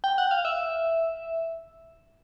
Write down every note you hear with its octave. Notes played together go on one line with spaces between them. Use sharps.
G5
F#5
F5
E5